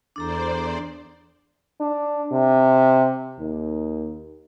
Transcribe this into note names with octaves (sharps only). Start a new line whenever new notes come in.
E2 D4 A4 C5 D5 A#5
D4
C3
D#2